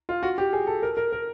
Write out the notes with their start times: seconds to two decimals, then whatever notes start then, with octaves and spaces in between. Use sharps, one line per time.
0.09 F4
0.23 F#4
0.38 G4
0.53 G#4
0.67 A4
0.83 A#4
0.97 A#4
1.12 A#4